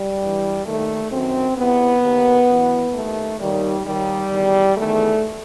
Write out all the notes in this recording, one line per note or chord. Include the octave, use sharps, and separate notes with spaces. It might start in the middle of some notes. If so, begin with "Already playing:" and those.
Already playing: G3
G2 E3
D#2 D#3 A3
F#2 D#3 C4
E2 C3 E3 B3
D#2 D#3
F#2 E3
D#2 D#3 A3
D#2 D#3 G3
D#2 D#3 G3
E2 D#3
E2 D#3 A3